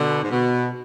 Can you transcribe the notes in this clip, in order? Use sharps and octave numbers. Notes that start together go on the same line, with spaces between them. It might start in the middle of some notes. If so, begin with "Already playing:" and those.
Already playing: B2 D3
G#2
B2